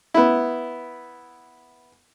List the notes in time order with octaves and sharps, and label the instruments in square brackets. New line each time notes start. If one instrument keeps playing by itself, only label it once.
[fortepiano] B3 E4